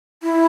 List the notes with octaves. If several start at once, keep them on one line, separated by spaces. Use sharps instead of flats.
E4